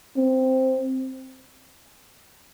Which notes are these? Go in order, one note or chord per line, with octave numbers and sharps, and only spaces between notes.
C4